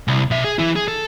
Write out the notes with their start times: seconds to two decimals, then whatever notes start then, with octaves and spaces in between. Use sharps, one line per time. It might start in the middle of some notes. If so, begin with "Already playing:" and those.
0.08 C2
0.31 B2 E5
0.44 G#4
0.59 E3 E4
0.76 G#4
0.88 A4